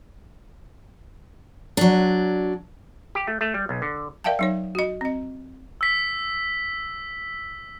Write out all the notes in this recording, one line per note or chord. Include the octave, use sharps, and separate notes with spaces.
F#3 D4
G4
A3
A3
G3
B1
D3
A#4 D5 E5 F5 G5 A5
F#3 D#4 C#5
F#4 D#5
C4 D#5
E6 B6